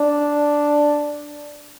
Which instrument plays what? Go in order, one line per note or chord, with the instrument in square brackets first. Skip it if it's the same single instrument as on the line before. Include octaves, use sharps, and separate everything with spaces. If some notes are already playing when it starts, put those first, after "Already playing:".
Already playing: [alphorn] D4